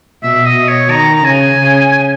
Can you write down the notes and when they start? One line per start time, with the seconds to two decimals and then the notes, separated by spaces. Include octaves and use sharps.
0.23 B2 E5
0.46 D#5
0.56 B2
0.68 C#5
0.90 D#3 A#5
1.15 A#5
1.24 C#3 G#5
1.58 C#3